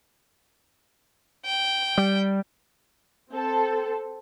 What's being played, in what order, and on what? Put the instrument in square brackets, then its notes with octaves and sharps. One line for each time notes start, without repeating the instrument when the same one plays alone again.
[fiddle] G5
[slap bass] G3
[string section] C4 A4